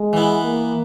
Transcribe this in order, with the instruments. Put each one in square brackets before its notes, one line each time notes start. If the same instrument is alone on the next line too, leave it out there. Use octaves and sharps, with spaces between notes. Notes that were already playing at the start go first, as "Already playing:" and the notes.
Already playing: [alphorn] G#3
[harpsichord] E3 B3 E4
[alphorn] A#3